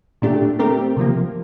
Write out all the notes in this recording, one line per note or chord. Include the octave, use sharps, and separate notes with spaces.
A#2 A3 D4 G4
A3 C4 G4 A#4
C3 F3 A#3